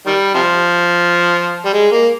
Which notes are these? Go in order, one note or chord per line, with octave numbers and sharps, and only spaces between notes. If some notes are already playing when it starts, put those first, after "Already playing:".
D#3 G3
C3 F3
G3
G#3
A#3